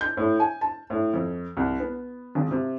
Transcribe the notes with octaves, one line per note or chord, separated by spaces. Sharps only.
G6
A2
G#5
A5
A2
F2
C2
B3
G#1
C3